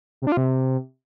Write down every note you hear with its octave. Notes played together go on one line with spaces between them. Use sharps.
C3
D4
F4
C3